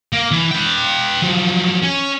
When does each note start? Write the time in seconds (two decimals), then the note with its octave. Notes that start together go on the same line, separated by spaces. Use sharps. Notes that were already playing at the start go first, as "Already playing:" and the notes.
0.13 A#3
0.31 E3
0.51 B4 G5
1.22 F3 F#3
1.82 C#4